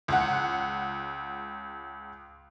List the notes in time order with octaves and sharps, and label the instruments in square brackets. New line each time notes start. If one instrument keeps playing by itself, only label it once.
[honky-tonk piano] C#2 F#5